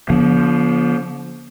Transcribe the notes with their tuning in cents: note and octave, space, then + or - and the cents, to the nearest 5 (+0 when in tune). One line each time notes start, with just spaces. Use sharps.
D3 -45 F3 +0 B3 -45